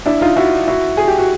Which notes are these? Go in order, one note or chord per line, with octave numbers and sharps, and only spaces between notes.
D4 E4
D#4 F4
E4 F#4
E4 F#4
G#4
G4
F#4